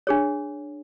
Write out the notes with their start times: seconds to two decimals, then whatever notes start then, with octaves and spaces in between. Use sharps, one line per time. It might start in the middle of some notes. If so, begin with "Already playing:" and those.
0.07 D4 G#4 C#5